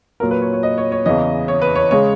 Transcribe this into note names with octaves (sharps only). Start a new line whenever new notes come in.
A#2 F#3 A#4
B4
C#5
C#5
D#5
C#5
C#5
E2 C#3 E3 D#5
C#5
B4
C#5
C#3 G#3 C#5